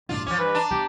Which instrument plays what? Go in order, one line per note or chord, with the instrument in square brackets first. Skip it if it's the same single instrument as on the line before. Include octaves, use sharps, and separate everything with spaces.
[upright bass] A1 G2 [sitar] D4 F4
[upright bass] E3 [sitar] F3 C#4 [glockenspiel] D6
[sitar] G2 [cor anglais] B4
[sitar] D4 [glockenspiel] A5 A#5
[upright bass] B3 [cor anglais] G4